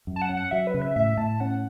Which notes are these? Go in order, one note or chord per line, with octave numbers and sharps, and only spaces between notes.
F#2
A5
F#5
C#4
F#5
F#3 E5
B4
C#3
E5
A2 E5
A2 A5
C#4 F#5